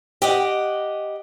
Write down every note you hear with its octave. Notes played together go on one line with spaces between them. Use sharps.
G4 D#5 F#5